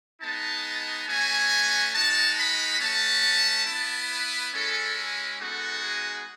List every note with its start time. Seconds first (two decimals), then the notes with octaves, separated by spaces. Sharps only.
0.21 G#3 B3 D#4 A5
1.08 A3 C#4 F#4 G#5
1.93 G#3 D#4 F#4 A5
2.38 B5
2.80 A3 C#4 F#4 A5
3.66 E4
3.72 B3
4.11 B4
4.53 G#3 C#4 E4 A4
5.40 G#3 B3 D#4 F#4 A4
5.84 G#4